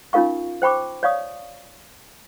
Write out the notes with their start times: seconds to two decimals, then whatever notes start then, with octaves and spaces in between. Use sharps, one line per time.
0.13 C#4 D#4 F4 A#4 F5 C#6
0.62 C5 G5 B5 C#6 D6
1.03 C#5 D5 F5 C#6 D#6